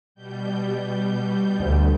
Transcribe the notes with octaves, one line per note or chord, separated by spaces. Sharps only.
B2 G3 G6
D2